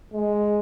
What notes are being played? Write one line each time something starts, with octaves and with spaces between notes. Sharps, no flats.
G#3